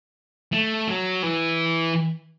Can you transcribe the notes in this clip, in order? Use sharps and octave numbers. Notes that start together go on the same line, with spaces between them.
A3
F#3
E3